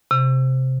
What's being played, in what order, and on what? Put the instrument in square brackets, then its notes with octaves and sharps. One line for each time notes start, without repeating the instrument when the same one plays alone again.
[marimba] C3